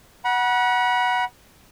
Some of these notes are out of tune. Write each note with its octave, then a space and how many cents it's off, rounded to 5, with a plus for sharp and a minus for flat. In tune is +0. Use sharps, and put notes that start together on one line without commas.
F#5 +0 B5 -40